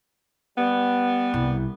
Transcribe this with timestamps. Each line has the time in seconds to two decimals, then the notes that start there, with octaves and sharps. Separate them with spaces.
0.57 G3 B3
1.34 C2